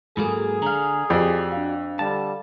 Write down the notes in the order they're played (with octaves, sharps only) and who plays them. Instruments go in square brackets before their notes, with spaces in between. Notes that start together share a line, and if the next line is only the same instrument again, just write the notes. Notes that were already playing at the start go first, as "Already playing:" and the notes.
[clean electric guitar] G#2 F#3 A#3 [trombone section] G#4 [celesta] A4 B5
[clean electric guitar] D3 F5 [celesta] A#5
[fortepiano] F2 [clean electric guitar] F#4 D5 [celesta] G4 C7
[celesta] D4 F5
[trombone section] D3 G3 [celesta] F5 [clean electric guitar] A5